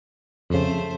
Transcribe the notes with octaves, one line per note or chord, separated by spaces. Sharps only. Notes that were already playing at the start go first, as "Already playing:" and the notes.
F2 C#3 A3 C5